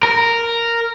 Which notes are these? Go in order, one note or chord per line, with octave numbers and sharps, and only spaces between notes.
A#4